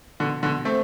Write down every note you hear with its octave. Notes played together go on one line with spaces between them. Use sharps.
B2 D3
B2 D3
A3 C4